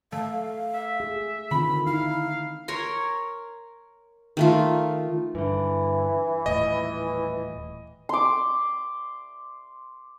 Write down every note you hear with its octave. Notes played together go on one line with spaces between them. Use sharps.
A3 F5
E5
G#4
D3 D#3 C4 F4 B5
D#4 E4 F5
A#4 C#5 A#5 C6
D#3 A3 F4
G2 D3 E3
D#1 A2 D#5
C6 D6